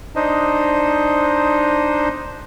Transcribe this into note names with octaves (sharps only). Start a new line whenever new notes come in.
D4 D#4 C5 D#5